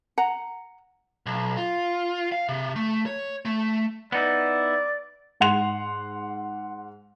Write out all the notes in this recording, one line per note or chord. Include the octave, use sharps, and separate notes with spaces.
F#5 A#5
B1
F4
F5
C3
A3
C#5
A3
B3 D#4 E4 D5
G#2 F#5 C6 F7